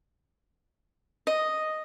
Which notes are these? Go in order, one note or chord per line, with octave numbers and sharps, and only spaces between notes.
D#5